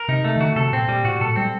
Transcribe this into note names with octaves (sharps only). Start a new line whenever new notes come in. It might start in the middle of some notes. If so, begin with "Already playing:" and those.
Already playing: A#4
C3 D#4
A3
D#3
D3 F#4
C3 A4
A#2 C4
A#2 G3
A2 F#4
A#2 A4
G3 C4